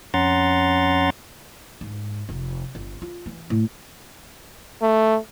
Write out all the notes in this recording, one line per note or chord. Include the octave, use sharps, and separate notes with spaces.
F2 C#4 F#5 A#5 C6 A6
G#2
F1
G1
F4
E3
A2
A3